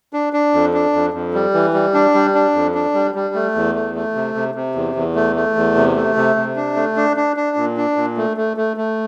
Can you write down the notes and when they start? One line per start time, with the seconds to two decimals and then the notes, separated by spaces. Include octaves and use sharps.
0.13 D4
0.33 D4
0.54 F2
0.74 D4
0.93 F2
1.14 F2
1.34 G3
1.54 E3
1.74 G3
1.94 D4
2.14 G3
2.35 D4
2.54 F2
2.75 D4
2.94 G3
3.15 G3
3.35 A3
3.55 E2
3.75 A3
3.95 A3
4.15 C3
4.35 C3
4.55 C3
4.75 E2
4.95 E2
5.15 A3
5.36 A3
5.56 E2
5.76 C3
5.96 A3
6.16 C3
6.36 C3
6.56 D4
6.76 A3
6.96 D4
7.17 D4
7.36 D4
7.57 A#2
7.77 D4
7.96 A#2
8.17 A3
8.37 A3
8.57 A3
8.77 A3